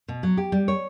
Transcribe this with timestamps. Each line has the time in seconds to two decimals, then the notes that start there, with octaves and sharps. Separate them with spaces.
0.08 B2
0.23 F#3
0.37 G4
0.52 G3
0.68 C#5